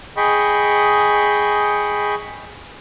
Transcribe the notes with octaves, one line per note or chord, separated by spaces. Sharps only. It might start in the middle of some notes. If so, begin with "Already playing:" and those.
G#4 D#5 G5 B5 C#6